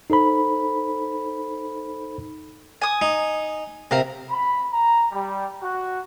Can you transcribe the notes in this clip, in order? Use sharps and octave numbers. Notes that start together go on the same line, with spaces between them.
D#4 A4 C5 B5
G#5 D#6
D#4
C3 A#4 F5 A#5
B5
A#5
G3
F#4